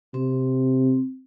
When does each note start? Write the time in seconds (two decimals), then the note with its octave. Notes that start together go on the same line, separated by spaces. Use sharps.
0.14 C3 C4